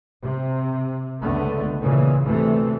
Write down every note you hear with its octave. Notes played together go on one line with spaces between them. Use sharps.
C3
C#2 D3 A3 B3
A#2 C#3 E3
D2 C3 E3 A3